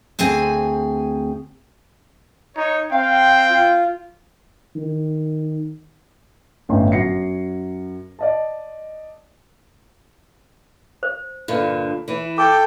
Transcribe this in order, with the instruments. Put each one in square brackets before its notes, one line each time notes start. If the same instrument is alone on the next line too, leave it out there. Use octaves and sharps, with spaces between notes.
[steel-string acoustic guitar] D2 C4 G#4 G#5
[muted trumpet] D#4 [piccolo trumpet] C#5
[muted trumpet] C4 [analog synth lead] F5 [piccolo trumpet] G5
[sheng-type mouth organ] F4
[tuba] D#3
[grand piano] G1 A2 C#4 D#4 C6
F#2 F#5 A#6 C7 C#7
D5 D#5 A5
[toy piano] C5
[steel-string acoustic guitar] G2 A#2 D3
E3 E4
[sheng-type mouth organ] A4 G5 [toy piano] D6